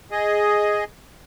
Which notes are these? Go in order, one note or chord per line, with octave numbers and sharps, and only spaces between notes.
G#4 D#5